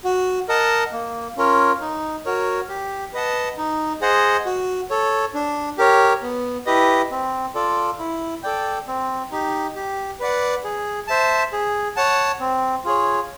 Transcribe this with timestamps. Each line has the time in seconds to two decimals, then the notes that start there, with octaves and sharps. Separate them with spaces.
0.04 F#4
0.49 A#4 D#5 F#5 A5
0.92 A#3
1.37 C#4 F4 A#4 C#5
1.81 D#4
2.25 F#4 A#4 C#5
2.69 G4
3.13 B4 D#5 F#5 A5
3.57 D#4
4.01 G#4 C5 D#5 F#5
4.46 F#4
4.90 A4 C#5
5.34 D4
5.78 G4 A#4 C#5
6.22 B3
6.66 E4 G4 B4 D#5
7.11 C4
7.55 F4 A4 D5
7.99 E4
8.43 A4 D5 G5
8.87 C4
9.32 D#4 G4
9.76 G4
10.20 B4 D5 F#5
10.64 G#4
11.08 C5 E5 A5
11.53 G#4
11.96 C#5 F#5 A5
12.40 C4
12.85 F4 G#4 C#5